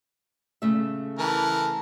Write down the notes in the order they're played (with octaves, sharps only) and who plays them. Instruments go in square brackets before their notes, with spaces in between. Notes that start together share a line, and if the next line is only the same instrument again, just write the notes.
[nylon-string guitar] C#3 A3 E5
[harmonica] E3 A#4 A5